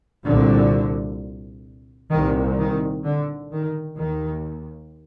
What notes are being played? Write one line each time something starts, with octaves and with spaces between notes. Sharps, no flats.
C2 A#2 D3
C2 A#2 D#3
D#3
D3
D#3
D#2 D#3